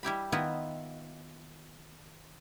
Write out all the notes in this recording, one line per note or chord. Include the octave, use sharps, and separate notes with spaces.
G3 E4 G4 B5
D#3 B3 E4 F4 D#5